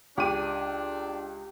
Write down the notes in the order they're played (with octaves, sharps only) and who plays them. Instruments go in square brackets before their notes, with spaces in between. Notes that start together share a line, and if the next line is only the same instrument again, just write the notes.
[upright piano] C#2 D#7 [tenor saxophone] D4 [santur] G4 D6